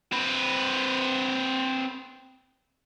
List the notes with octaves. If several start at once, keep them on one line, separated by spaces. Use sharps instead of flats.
C4 B4